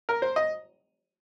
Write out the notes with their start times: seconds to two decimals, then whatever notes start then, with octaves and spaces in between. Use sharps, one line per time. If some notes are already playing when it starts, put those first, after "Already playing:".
0.09 A#4
0.22 C5
0.36 D#5